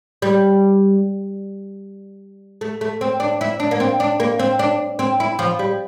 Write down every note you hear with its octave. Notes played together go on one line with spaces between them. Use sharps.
G3
A3
A3
C4
D4
E4
D4
A#3
C4
D4
A#3
C4
D4
C4
E4
F3
G3